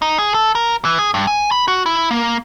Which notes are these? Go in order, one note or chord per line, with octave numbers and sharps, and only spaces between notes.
D#4
G#4
A4
A#4
E3
G#4
G2
G#5
B5
F#4
E4
A#3